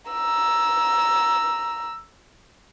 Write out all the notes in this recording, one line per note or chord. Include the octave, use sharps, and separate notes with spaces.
A#5 E6